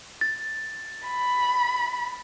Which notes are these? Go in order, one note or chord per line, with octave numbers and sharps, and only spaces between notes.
A6
B5